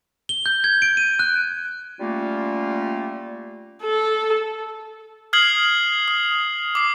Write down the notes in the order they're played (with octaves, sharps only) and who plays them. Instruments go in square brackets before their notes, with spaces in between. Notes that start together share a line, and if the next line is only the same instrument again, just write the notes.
[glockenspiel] G7
G6
G#6
D7
D#7
F#6
[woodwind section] G3 A3 A#3 C#4 F4
[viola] A4
[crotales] D#6 F6 G#6 C7 F#7
D#6
D6 C7